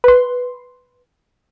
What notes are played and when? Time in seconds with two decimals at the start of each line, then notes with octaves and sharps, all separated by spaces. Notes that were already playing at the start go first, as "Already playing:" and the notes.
0.04 B4 C6